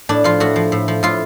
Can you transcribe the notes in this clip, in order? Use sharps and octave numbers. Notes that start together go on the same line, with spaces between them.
A2 D4
F3 F4
A2 F#4
F3
A2
F3
A2 F4